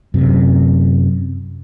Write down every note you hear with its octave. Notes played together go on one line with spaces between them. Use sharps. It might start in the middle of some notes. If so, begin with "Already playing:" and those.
F#2 C3